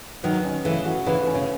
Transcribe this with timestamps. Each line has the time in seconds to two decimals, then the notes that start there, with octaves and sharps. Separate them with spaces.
0.23 D#3 F#3 B4
0.44 C#4
0.65 C#3 E3 A3
0.85 F#4
1.06 C#3 E3 B4
1.27 C#4
1.35 C#3